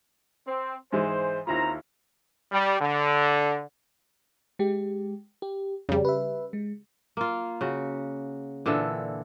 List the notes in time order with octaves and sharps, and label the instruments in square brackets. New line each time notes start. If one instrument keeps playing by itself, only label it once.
[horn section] C4
[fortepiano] G#2 E3 G#3 [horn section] C5
[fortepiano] D#2 E4 F4 [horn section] C4 C5 A#5
[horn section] G3
D3
[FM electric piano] G#3 G4
G4
[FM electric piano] F2 [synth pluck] C#3 G3
[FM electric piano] B4 E5
G#3
[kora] A#3 F4
C#3 F#4
A#2 D3 E3 A4